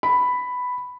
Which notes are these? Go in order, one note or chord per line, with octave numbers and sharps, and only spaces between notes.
B5